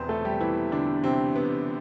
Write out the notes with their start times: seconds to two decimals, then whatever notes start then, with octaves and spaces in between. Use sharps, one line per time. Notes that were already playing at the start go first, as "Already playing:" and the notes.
Already playing: E1 E2 C3 B3 C4 B4 C5
0.09 A3 A4
0.25 G3 G4
0.40 E3 E4
0.72 D3 D4
1.04 C3 C4
1.36 B3